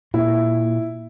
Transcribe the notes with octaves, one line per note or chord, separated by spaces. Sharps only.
A#2 E4